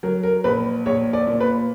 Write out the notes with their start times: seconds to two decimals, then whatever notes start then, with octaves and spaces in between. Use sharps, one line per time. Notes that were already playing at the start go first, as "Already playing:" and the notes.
0.03 F#3 A#4
0.23 A#4
0.44 A#1 B4
0.86 A#1 C#5
1.13 D5
1.27 A#2
1.40 B4